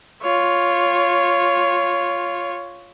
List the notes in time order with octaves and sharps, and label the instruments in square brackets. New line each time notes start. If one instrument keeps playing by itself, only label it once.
[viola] F4 C#5